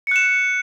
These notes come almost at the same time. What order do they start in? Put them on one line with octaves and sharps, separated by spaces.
C#7 F#6 E7